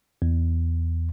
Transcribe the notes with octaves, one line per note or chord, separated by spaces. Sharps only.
E2